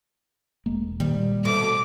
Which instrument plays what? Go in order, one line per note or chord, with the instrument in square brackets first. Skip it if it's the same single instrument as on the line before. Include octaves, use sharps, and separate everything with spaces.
[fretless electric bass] E1 G#3 A#3
[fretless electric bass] A#2 D#3 A#3 [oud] G3
[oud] B2 D3 A3 [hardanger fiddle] D6